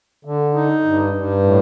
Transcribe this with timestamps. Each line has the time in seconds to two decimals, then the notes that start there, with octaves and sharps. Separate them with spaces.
0.25 D3
0.54 D#4
0.84 G2
1.13 G2
1.43 A2